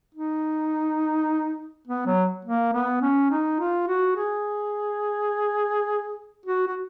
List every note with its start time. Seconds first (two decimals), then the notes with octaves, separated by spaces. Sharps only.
0.15 D#4
1.87 B3
2.07 F#3
2.45 A#3
2.73 B3
3.02 C#4
3.31 D#4
3.60 F4
3.88 F#4
4.16 G#4
6.46 F#4
6.67 F#4